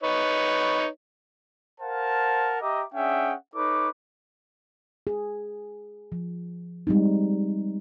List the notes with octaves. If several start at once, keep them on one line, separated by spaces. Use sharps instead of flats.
D#4 B4 C#5
A#4 C5 F5 F#5 A5
G4 D#5 E5 A#5 D6
C#4 D4 G#4 E5 F#5 G5
D#4 A4 B4 C#5 D6
G#4
F3
G3 G#3 C4 D#4